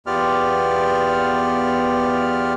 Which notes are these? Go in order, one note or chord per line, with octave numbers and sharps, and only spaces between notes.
E2 B3 F4 G4 D5 F6